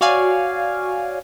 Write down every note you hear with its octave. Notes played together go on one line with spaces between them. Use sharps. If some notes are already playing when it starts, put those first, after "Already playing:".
F#4 C#5 D5 F5 G#5